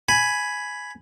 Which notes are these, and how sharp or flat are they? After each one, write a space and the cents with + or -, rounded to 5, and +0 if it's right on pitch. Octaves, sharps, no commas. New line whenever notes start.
G#5 +5 B5 +0